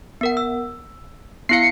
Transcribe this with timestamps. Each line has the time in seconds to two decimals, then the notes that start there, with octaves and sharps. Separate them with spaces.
0.21 B3 A#4 F#5
0.37 E6
1.49 B3 E4 F5 C7 C#7